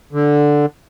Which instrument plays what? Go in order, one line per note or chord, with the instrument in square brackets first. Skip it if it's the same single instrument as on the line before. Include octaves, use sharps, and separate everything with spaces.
[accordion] D3